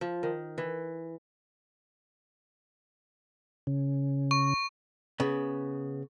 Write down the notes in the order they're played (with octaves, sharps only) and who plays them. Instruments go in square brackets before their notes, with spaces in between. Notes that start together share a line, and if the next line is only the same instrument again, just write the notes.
[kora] F3
D#3
E3
[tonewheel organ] C#3
[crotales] C#6
[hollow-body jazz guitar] C#3 B3